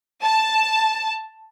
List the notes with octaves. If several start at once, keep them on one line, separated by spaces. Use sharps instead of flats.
A5